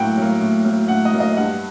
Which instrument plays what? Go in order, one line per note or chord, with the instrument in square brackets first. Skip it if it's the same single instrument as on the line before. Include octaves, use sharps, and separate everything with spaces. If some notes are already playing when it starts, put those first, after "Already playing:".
Already playing: [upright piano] A2 F#3 A#3 F#5 G5
F#3 A#3
A2
F#3 A#3
A2 F#5
D#5
F#3 A#3
D#5
G2 F#5